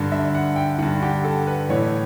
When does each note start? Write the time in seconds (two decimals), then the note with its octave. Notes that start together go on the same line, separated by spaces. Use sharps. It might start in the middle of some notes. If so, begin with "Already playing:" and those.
Already playing: G2 D3
0.12 E5
0.35 F#5
0.56 G5
0.79 D3 F#5
0.83 G2
1.02 G4
1.24 A4
1.47 B4
1.69 A2 E3 C#5